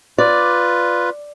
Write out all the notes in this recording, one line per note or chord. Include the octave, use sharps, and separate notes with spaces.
F4 B4 D5